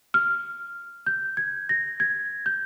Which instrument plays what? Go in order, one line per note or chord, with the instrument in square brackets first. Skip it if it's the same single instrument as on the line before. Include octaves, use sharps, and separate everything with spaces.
[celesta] F6
G6
G#6
A#6
G#6
G6